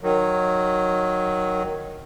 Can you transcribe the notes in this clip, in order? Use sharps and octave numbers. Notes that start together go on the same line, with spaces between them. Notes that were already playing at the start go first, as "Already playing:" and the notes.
D#3 F#3